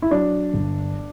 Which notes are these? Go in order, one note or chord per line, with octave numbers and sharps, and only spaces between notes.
E4
F#3 D4
G1